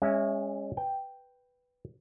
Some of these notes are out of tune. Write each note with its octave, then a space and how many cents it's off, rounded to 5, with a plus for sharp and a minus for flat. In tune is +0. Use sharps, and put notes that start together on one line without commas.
G#3 -30 C#4 -5 E5 +0
B4 +0 G5 +0